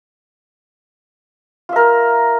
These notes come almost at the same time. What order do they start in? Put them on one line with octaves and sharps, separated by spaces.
F4 E5 A#4